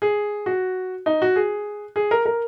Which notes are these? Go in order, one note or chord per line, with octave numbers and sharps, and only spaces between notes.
G#4
F#4
D#4
F#4
G#4
G#4
A#4
A#4